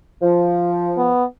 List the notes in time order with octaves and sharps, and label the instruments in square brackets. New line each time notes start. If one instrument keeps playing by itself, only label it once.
[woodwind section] F3
[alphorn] B3